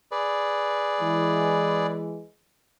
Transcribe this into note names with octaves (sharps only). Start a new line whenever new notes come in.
G#4 B4 D5
E3 G#3